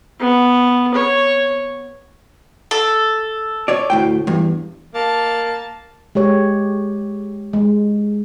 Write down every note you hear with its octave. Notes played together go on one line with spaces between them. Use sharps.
B3
C#5
A4
C#5 D5
D2 A2 G5
E2 G2
A#3 A5
G#3 G4 C#5
G#3